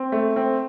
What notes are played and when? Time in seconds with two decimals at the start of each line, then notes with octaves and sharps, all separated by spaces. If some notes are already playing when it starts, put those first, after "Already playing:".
Already playing: C4
0.12 A3
0.36 C4